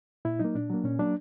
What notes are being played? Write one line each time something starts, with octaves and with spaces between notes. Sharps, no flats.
A#2 E4
F#3 A#3 D#4
A#2 D4
F#3 A#3
A#2 C#4
F#3 A#3 D4